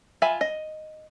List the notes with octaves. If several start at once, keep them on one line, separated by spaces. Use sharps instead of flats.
F4 E5 G#5 B5
D#5